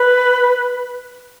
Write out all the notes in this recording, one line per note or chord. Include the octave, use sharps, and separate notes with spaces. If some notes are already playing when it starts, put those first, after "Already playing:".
Already playing: B4